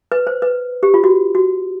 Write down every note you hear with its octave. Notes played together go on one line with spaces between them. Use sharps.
B4
C5
B4
G4
F4
F#4
F#4